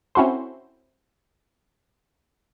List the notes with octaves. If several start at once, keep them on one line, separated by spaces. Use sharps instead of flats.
C4 C#4 E4 F#4 A4 C5